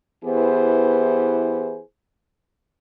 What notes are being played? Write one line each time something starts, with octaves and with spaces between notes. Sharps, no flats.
E3 B3 E4 G4 G#4 C5